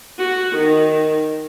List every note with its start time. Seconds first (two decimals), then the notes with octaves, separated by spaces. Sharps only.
0.19 F#4
0.56 D#3